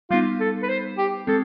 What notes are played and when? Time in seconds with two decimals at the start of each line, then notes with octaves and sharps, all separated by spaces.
0.11 G3 B3 D#4 F4
0.40 A4
0.63 B4
0.69 C5
0.98 G4
1.27 G#3 C4 A4